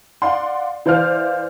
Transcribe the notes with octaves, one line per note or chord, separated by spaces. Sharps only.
D5 F5 F#5 C6
E3 C5 D5 F5 F6